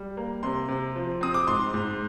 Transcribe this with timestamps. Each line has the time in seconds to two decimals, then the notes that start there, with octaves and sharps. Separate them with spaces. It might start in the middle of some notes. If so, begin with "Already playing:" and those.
Already playing: G3
0.17 A#3
0.43 C3 C6
0.68 C3
0.95 F3
1.21 C4 D#6
1.34 D6
1.47 G#2 C6
1.74 G#2